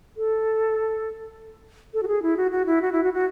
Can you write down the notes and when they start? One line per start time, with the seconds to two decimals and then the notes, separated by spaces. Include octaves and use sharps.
0.17 A4
1.94 A4
2.03 F#4
2.08 G#4
2.22 E4
2.37 F#4
2.51 F#4
2.66 E4
2.82 F#4
2.92 E4
3.03 F#4
3.14 F#4